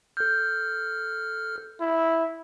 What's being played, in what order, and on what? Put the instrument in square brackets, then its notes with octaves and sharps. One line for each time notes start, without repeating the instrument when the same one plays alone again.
[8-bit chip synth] A4 F6 [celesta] G6
[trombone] E4